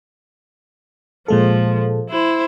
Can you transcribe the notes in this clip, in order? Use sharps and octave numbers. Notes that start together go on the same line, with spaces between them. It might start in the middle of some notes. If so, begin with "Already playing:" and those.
A#2 F3 G#3 A4
E4 C5